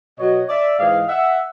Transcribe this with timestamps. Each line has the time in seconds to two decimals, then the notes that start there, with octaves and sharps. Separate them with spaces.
0.18 B2 F#3 C#5 D#5
0.48 D5 E5
0.78 G#2 E3 D#5 F5
1.08 E5 F#5